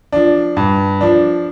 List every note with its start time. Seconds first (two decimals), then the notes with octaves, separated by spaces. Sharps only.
0.12 F3 D4
0.57 G2
1.01 F3 D4